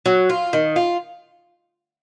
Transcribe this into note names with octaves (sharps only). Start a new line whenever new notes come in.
F#3
F4
D#3
F4